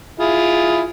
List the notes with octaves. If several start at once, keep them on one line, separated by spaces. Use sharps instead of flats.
E4 F4 G#4